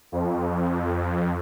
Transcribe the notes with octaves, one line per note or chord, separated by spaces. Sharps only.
F2